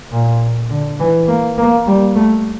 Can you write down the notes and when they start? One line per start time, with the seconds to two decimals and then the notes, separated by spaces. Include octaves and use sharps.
0.12 A#2
0.70 D3
1.00 E3
1.28 A#3
1.58 A#3
1.87 G3
2.15 A3